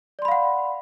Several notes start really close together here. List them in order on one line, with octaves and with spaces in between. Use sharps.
D5 C6 B5 F5 F#5